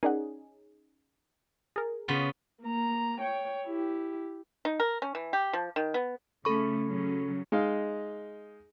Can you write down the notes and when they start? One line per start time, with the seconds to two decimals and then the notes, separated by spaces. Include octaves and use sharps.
0.03 C#4 D#4 G#4 A#4 D5 F#5
1.76 G#4 A#4 A6
2.08 C#3 B3 F4
2.63 A#3 A#5
3.21 C#5 G5
3.65 E4 G4
4.65 D#4
4.80 A#4
5.02 C#4
5.15 E3
5.33 G4
5.53 F3
5.76 D#3
5.94 B3
6.45 C#3 A3 C#4 A4 B5 C#6
6.88 C#3 F#3 C#4
7.52 G#3 D#4 F5